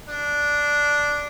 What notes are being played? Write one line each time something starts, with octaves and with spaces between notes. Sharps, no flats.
D4